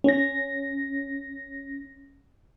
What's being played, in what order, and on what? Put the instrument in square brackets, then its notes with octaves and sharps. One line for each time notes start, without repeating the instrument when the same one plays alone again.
[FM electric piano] C#4 A#6